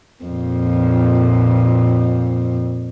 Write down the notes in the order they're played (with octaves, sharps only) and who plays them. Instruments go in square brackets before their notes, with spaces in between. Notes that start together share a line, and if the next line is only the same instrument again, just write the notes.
[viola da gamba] F2 A#2